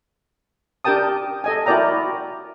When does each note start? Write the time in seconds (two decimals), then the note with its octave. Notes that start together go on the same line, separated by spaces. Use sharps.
0.84 D4 G4 A#4 G5 A5 D#6
1.44 A4 D#5 G#5
1.66 E4 F#4 A#4 D5 G5 A#5